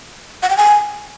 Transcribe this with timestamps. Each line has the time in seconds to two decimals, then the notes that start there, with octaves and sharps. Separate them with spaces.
0.43 F#5
0.50 G5
0.57 G#5